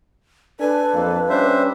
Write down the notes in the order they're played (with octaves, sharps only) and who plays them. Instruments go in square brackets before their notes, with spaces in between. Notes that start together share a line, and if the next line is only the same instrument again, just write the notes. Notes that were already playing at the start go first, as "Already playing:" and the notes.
[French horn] D4 [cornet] A4 [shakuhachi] B4 [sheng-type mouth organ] G#5
[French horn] F2 [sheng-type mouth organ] A#3
[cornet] G3 [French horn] C#4 [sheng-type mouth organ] D4 C5 E5